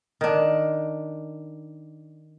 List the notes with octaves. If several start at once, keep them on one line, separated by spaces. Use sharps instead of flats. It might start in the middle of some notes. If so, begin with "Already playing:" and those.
D#3 D4